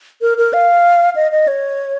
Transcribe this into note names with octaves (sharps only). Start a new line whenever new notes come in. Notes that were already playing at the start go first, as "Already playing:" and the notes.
A#4
A#4
F5
D#5
D#5
C#5